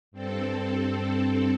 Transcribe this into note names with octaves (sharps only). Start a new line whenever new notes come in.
G2 C4 A4